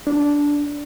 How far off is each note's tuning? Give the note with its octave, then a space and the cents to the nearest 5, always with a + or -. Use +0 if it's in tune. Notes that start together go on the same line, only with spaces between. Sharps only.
D4 -10